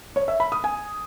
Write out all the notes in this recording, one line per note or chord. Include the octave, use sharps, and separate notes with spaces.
C#5
E5
B5
D#6
G#5